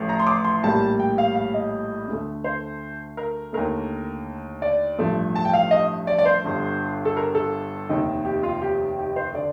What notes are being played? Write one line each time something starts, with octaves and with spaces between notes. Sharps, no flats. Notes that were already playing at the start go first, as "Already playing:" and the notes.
Already playing: A1 A2 F3 A3
A#5
C6
D6
C6
A#1 A2 G3 A#3 A5
G5
F5
F5
D#5
D2 D3 A3
C5
A#4
D#2 D3 A3 A#4
D5
A1 G2 F3 A3
A5
G5
F5
D#5
D5
D5
C5
G1 G2 D3
A4
A#4
A4
F1 D#2 D#3
G4
F4
G4
G4
C5
D3 D5